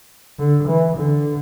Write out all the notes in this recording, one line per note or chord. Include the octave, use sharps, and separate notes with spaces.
D3
E3
D3